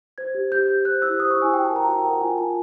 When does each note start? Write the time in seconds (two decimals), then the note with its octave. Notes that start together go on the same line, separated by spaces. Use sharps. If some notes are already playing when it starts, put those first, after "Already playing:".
0.18 C5 G#6
0.35 G4
0.52 G4 G6
0.68 G4
0.85 C5 F#6
1.02 E4 E6
1.20 C5 D#6
1.31 C#6
1.37 E4
1.42 G#5
1.53 F#4 G5
1.65 A5
1.71 A#4
1.76 A#5
1.87 F#4 A5
1.99 G5
2.05 A#4
2.10 F#5
2.21 F4 G#5
2.38 F4 A5